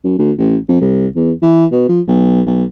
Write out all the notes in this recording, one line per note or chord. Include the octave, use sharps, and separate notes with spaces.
F#2
D2
A1
F2
C2
E2
E3
B2
F3
B1
B1